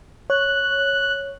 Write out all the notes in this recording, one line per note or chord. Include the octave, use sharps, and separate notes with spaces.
C#5 F#6